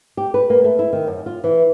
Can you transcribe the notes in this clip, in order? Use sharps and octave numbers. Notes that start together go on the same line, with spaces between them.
G4
B4
A#3
A3
E4
D#3
F#2
F4
E3